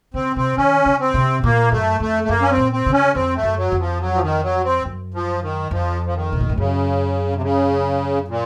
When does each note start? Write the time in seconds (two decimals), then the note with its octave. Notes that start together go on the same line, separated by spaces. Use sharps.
0.14 C#3 C4
0.36 C3 C4
0.57 D#3 C#4
0.86 C#3
1.00 C4
1.14 C3
1.44 A#2 A#3
1.71 F#2 A3
2.00 F2 A3
2.23 A3
2.29 F#2 A#3
2.42 C#4
2.50 C4
2.57 A#2
2.72 C4
2.86 C#3
2.92 C#4
3.15 F2 C4
3.35 A3
3.43 F#2
3.57 F#3
3.72 F2
3.79 F3
4.00 F#3
4.14 F3
4.22 D#3
4.43 F#3
4.64 C4
4.85 F#2
5.14 F3
5.42 D#3
5.71 F2 F3
6.06 F3
6.15 D#3
6.32 C3
6.40 A#2
6.49 A2
6.57 F#2 C#3
7.35 C3
7.42 C#3
8.28 A#2